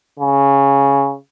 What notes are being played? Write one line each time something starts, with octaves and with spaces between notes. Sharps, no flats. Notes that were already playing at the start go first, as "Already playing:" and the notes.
C#3